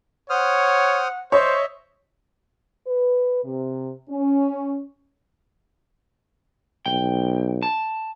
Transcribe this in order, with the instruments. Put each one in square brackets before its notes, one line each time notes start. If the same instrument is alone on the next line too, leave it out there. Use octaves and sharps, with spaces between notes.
[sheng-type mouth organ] C5 D#6 F6 [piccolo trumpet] C#5 [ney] F#5
[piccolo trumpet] C5 [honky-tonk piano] C#5 [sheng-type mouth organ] D#5 E5
[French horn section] B4
C3
C#4
[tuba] B1 [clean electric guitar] G5
[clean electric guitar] A5